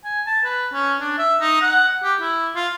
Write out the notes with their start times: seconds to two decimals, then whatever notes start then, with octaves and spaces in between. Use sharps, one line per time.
0.04 G#5
0.27 A5
0.44 B4
0.73 C#4
1.01 D4
1.18 E5
1.40 D#4
1.62 F#5
2.04 G4
2.21 E4
2.55 F4